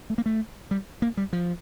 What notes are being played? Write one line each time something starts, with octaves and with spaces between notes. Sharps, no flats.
A3
A#3
A3
G3
A#3
G3
F3